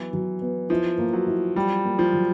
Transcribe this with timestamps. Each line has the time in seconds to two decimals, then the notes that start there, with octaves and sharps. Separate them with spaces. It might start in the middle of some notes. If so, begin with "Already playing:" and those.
Already playing: E3 F#3 B3
0.13 F#3
0.42 B3
0.70 F3 E4
0.98 A#3
1.13 F#3
1.27 E4
1.56 G3 F#4
1.84 A#3
1.99 F3
2.13 F#3